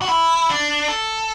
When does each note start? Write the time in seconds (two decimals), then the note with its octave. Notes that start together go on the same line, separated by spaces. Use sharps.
0.02 F#4
0.09 E4
0.49 D4
0.88 A4